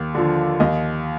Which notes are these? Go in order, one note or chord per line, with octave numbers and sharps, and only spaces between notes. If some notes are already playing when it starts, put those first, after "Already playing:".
Already playing: D#2
D3 F3
D#2 D#5